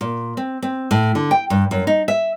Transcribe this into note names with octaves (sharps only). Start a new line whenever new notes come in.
A#2
C4
C4
A2
D3
G5
G2
F#2
D#4
E5